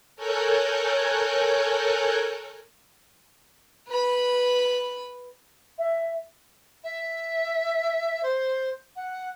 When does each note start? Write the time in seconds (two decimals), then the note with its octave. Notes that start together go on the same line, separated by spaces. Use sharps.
0.16 A4 A#4 C#5 G#5 F#6 G6
3.88 B4 B5
5.79 E5
6.84 E5
8.23 C5
8.96 F#5